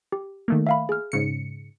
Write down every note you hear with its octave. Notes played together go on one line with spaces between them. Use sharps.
G4
D#3 A3 A#3
E5 F5 B5
G#4 F6
G#2 C#3 C#7